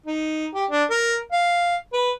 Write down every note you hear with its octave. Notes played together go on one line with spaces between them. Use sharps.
D#4
G4
D4
A#4
F5
B4